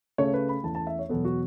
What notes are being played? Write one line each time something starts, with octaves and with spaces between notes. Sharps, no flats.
C#3 A3 C#4 C#5
B4
B5
E2 E3 A3 C#4 A5
A5
E5
C#5
E2 B2 F#3 B3 A4
F#4